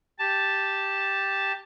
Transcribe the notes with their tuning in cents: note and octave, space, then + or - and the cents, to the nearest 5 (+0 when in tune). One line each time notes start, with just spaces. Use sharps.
G4 +0 A5 +0